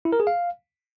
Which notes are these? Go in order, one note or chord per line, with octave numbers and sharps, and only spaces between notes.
E4
A#4
G#4
F5